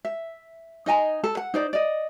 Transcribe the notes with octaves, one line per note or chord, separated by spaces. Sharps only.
E5
D#4 D#5 G#5 A#5
A4
F#5
D#4 C5 D5
D5 D#5